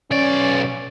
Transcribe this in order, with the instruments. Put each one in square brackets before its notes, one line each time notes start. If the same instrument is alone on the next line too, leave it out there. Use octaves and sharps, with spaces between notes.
[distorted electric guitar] B1 D5 [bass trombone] C#4